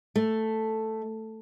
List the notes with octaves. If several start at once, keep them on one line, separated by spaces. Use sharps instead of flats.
A3